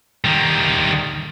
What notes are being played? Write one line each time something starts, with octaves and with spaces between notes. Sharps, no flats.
D#3 G3